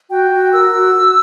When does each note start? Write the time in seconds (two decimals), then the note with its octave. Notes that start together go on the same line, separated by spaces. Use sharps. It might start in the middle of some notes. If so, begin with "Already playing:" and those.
0.10 F#4 G5
0.30 F#4
0.52 A#4 E6
0.73 F#4
0.94 F#4